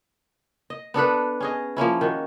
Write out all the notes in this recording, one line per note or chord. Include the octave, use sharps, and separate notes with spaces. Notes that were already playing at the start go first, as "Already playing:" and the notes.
D#5
B3 D4 A4 B4
C#4 G#4 D#5
F3 A#3 C#4 E4
D#3 F#4